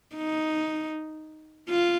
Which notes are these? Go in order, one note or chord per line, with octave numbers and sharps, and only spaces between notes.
D#4
F4